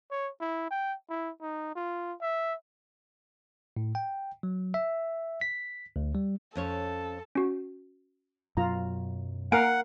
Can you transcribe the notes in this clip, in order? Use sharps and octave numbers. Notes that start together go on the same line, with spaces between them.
C#5
E4
G5
E4
D#4
F4
E5
A2
G5
F#3
E5
B6
D2
G3
F2 C#4 A4 C#5
C#4 F#4
F#2 B2 F#3 F4 A#5
A#3 A#4 F5 F#5 G#5 D7